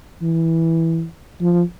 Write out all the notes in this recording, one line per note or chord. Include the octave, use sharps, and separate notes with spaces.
E3
F3